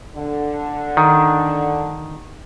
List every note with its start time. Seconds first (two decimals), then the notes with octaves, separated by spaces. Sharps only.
0.16 D3
0.97 D#3